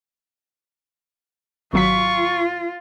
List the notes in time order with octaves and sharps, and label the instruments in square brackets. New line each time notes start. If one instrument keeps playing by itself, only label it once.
[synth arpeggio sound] G#1 F#3 B6 [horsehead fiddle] F4 [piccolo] C#6